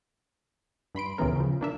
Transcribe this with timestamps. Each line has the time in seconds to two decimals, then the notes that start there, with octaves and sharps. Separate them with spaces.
0.95 G2 B5 C6 D7
1.18 D2 A#2 C#3 E3 B3 A#4
1.36 C#3 F3
1.61 A#3 D4 E5